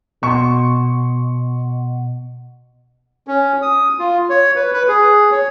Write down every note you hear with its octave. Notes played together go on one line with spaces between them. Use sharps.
B2 C6 C#6
C#4
D#6
F4
C#5
B4
B4
G#4
C#5